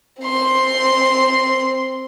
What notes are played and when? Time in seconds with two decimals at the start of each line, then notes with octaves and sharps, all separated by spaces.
0.22 C4 C6